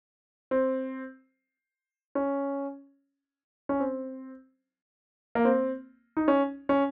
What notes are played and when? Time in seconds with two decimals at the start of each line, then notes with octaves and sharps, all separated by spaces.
0.51 C4
2.15 C#4
3.69 C#4
3.80 C4
5.35 A#3
5.45 C4
6.17 D#4
6.28 C#4
6.69 C#4